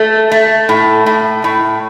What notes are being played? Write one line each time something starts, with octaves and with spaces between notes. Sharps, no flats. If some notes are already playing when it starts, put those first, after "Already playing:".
Already playing: A3
A3
A2
A2
A2